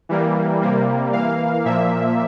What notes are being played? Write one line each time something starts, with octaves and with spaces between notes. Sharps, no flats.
E3 G3 A#3
C3 G3 A#3
E3 A#3 F5
A#2 F3 A#3 E5